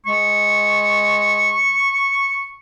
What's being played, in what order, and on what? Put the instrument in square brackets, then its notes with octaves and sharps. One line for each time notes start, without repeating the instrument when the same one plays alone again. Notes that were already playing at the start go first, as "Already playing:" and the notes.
[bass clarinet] G#3 [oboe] C#6